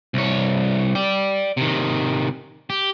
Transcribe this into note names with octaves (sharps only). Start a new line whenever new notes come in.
C2 C#5
D5 G5
C3 D#3
G4